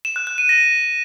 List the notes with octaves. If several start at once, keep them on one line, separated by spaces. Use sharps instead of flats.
E7
F#6
F#6
D#7
A#6